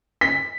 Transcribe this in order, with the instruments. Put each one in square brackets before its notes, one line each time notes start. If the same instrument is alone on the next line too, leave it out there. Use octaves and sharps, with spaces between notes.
[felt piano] B6